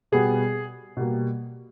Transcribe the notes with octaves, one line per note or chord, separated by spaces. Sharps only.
B2 G3 B3 G#4
B2 G3 A#3